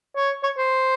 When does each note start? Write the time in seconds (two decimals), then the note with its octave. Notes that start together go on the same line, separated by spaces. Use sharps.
0.16 C#5
0.43 C#5
0.58 C5